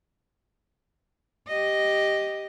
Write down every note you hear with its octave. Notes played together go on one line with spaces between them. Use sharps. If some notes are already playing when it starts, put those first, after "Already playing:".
G4 D#5